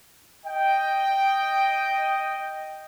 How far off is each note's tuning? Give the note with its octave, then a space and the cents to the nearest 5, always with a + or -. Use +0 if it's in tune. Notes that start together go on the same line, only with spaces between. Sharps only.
D#5 +0 G5 +0